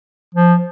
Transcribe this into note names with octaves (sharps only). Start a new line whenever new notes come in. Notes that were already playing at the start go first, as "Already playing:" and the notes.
F3